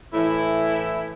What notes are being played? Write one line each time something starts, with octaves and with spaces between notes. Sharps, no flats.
A2 E3 E4